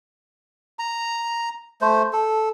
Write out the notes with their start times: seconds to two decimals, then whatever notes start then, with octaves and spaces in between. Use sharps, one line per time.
0.79 A#5
1.81 A3 C5
2.13 A4